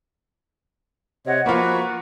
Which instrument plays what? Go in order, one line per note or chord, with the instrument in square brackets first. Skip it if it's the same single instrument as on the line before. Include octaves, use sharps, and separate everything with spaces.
[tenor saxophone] C3 [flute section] C#5 D#5 F#5
[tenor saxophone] F3 [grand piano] A#3 F4 [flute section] F#4 B4 C#6